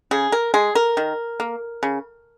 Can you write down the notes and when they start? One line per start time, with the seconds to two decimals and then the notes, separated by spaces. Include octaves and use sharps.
0.11 C#3 G#4
0.32 A#4
0.54 G#3 G#4
0.75 A#4
0.97 D#3
1.40 A#3
1.83 C#3